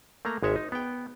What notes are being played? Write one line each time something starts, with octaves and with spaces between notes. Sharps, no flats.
A3 A#3 A#5
G#1 G#3 C#5 E5
D#4
B3 G5